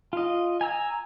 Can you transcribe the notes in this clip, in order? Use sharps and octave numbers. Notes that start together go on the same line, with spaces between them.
F4 D#5
G#5 A#5 E6